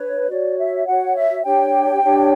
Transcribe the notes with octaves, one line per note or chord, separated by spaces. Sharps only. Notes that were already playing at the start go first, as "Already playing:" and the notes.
Already playing: D4 B4 C#5
F#4 C#5 D5
E5
F#4 C#5 F#5
E5
D4 G4 C#5 G5
D4 G4 C#5